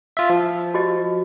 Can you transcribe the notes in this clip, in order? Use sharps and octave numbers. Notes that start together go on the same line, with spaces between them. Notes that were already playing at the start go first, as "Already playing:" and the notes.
F4 E5
F3
F#4 G4 D#5